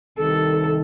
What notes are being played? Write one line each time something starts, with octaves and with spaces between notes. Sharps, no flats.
C2 C3 D#3 G3 A4